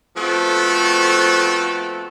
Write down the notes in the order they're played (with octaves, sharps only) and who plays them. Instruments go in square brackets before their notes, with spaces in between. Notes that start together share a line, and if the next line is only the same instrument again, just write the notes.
[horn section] F3 A3 B3 C4 F#4 A4